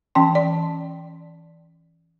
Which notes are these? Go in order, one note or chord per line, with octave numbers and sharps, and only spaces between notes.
E3 C#4 G5 A5 C6
D5